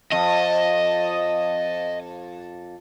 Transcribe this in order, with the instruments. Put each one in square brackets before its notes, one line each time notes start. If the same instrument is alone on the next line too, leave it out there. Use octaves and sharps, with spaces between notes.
[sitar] F2 [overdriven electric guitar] D#5